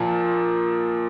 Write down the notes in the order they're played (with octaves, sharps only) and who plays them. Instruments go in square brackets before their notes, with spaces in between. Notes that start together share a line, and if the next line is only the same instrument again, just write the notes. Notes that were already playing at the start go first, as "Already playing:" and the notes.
Already playing: [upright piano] A#2 F3 A5